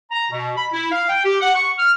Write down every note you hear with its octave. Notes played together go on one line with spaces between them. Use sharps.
A#5
B2
B5
E4
F5
G5
G4
F#5
C#6
F6